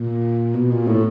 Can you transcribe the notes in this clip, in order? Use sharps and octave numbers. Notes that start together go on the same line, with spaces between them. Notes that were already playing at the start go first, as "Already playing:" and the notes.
Already playing: A#2
B2
A#2
A2